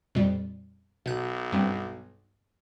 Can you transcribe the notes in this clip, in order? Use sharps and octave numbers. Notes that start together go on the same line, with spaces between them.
F2 A#2 G3
B1 B2 F#6
G2 G3 C4